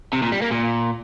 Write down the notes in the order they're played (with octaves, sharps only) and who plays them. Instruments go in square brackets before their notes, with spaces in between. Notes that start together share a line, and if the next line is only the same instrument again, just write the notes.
[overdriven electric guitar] C3
A#2
G3
A#3
A#2